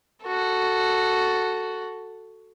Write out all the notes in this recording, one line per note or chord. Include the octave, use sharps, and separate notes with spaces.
F#4 A4